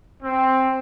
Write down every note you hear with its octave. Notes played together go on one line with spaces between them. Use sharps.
C4